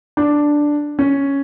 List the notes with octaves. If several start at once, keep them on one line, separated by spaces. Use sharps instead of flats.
D4
C#4